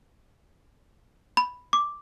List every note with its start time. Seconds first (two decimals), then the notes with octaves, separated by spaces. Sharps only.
1.37 B5
1.73 D6